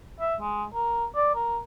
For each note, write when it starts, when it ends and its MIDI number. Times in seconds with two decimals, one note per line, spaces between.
0.21 0.35 76
0.40 0.64 56
0.74 1.05 70
1.15 1.33 74
1.35 1.59 70